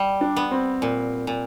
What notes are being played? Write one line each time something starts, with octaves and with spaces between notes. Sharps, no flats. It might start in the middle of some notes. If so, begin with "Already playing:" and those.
Already playing: G3
D4
B3
C4
A#2
A#2